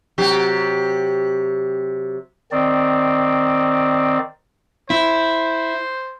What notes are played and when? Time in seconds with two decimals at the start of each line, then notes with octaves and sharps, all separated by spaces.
0.18 C3 F#3 G4
2.52 D#3 C4 D5
4.90 E4 C5